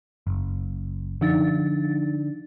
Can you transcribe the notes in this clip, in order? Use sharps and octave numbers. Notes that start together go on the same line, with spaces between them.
F#1
D3 F3 D#4 A6